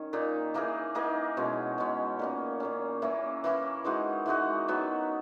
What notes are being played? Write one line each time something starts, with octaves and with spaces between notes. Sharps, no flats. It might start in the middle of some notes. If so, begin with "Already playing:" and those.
Already playing: D#3 C#4
A#2 A#3 D#4
E3 A#3 D#4 G#4
E3 A#3 D#4 G#4
B2 G#3 C#4
B2 G#3 C#4
A#2 A#3 C#4
A#2 A#3 C#4
E3 A#3 C#4 E4
E3 A#3 C#4 E4
E3 G#3 D#4 F#4
E3 G#3 D#4 F#4
D#3 F#3 B3 F#4